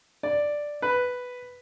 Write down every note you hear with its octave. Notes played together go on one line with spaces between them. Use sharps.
D5
B4